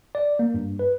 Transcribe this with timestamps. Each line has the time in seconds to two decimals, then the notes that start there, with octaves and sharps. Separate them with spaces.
0.15 D5
0.39 A#3
0.54 G2
0.79 B4